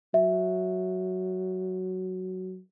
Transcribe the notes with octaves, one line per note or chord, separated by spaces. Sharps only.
F#3 E5